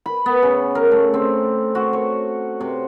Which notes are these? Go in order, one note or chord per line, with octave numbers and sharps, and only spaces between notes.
B5
B3
C#3
A#4
A3
C4
F#4
C#5
C3